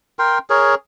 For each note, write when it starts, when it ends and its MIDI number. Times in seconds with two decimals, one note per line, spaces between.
0.19 0.38 70
0.19 0.38 79
0.19 0.38 84
0.50 0.75 68
0.50 0.75 70
0.50 0.75 73